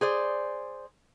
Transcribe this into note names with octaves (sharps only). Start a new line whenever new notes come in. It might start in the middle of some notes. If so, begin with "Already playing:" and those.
G#4 C5 D5